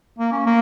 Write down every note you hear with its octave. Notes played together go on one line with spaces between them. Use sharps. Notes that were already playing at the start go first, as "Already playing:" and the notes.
A#3
C#4
A#3